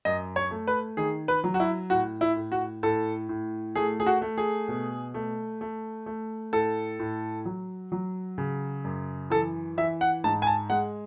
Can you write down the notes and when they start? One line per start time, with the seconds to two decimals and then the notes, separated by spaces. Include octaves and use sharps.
0.05 F#2 D#5
0.36 C#5
0.51 A3
0.67 B4
0.97 D#3 G#4
1.28 B4
1.44 F#3
1.54 F#4
1.60 E4
1.90 A2 F#4
2.21 E4
2.36 A2
2.52 F#4
2.83 A2 A4
3.29 A2
3.75 A3 G#4
4.00 G#4
4.06 F#4
4.22 A3
4.38 G#4
4.68 B2
5.14 A3
5.61 A3
6.06 A3
6.53 A2 A4
6.99 A2
7.45 F#3
7.92 F#3
8.38 C#3
8.84 F#2
9.30 E3 A4
9.77 E3 E5
10.01 F#5
10.24 G#2 A5
10.42 G#5
10.47 A5
10.70 G#3 F#5